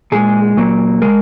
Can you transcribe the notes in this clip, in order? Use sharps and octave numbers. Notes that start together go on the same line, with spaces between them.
A#2 G#3 G#4
A#2 F#3 A#3
C#3 G#3 A#4